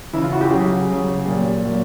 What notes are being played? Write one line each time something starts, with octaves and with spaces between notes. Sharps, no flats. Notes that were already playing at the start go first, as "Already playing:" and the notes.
C#3 E3 E4
F4
F#4
G4
C#3 F#3 G#4
C#3 F#3
A#2 F#3 G4
A#2 F#3